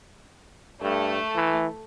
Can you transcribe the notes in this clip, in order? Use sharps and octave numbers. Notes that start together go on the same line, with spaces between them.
G2 A3
E3